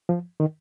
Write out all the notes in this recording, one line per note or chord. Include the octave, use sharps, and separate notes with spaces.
F3
D#3